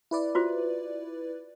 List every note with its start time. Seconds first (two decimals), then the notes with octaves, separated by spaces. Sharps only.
0.11 E4 B4 D5
0.35 F4 F#4 C5